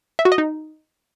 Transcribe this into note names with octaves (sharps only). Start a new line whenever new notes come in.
E5
F#4
D#5
D#4